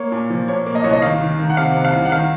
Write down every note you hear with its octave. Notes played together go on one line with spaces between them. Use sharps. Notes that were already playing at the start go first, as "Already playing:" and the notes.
Already playing: A#3 C#5
A#2
F3
A#2 C#5
A#3
D#5
C2 C#5
D#5
D#3 F5
D#3
D#3
F#5
C3 F5
C3
F5
C2
F#5
D#3 F5